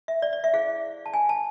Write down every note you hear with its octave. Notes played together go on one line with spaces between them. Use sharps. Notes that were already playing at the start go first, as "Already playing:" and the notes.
E5
D5
D5
E5
E4 G#4 C5 F5
A5
G#5
A5